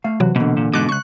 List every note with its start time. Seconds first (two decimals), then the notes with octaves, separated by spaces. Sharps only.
0.04 A3 F5
0.20 C3 E3 F#3 F#4
0.36 B2 D3 E3 A#3
0.57 A#2
0.73 G#2 B2 D6 F#6
0.89 C#2 C#6 F#6